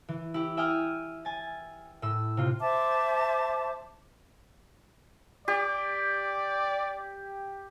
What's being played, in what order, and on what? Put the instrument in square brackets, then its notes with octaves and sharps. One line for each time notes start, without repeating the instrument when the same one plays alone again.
[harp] E3
E4 G4
E5 G5 G#5 D#6 F6
G#5 A6
A2 E6
C3 F4
[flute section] C5 E5 A5 D6
[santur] G4 [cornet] D5